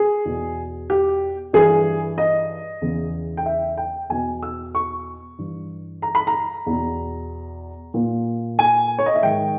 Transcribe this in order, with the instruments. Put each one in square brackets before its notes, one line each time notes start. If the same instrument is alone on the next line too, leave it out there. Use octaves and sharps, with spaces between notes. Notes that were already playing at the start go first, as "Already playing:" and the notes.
Already playing: [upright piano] G#4
E2 B2
G4
G2 E3 G#4
D#5
E2 C#3 E3
G5
E5
G5
E2 B2 G#5
E6
C#6
G2 E3
A#5
B5
A#5
E2 B2
A#2
G#5
C#5
D#5
E5
G#2 D#3 G5